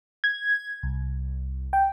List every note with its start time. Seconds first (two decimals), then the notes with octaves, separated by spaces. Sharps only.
0.24 G#6
0.83 C2
1.73 G5